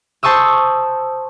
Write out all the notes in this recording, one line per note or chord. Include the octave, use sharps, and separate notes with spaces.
C5 A5 C#6 D#6 E6